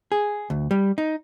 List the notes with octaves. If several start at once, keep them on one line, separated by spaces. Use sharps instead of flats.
G#4
D2
G3
D#4